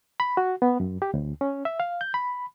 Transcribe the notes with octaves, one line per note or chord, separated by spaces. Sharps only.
B5
F#4
B3
F#2
G4
D2
C#4
E5
F5
G6
B5